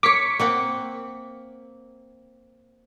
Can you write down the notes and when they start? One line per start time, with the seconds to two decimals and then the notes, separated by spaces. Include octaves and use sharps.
0.03 A#4 C#5 D6 B6 C#7
0.39 A#3 C4 F#5